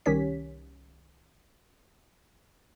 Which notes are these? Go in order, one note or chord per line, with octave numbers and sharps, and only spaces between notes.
C2 D#3 C#4 G4 C#5 B6